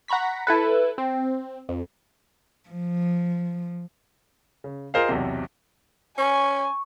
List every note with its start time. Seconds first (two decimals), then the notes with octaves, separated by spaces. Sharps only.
0.08 F#5 A#5 B5 C#6 B6
0.47 E4 A4 B4
0.98 C4
1.69 F2
2.69 F3
4.64 C#3
4.94 F4 G#4 A#4 C5 D#5 F5
5.09 B1 E2 C3
6.18 C#4 G#5 C#6